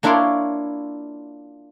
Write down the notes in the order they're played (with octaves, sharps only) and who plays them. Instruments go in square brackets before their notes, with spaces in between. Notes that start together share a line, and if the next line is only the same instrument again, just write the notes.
[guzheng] A#3 D4 E4 F4 C#5 C6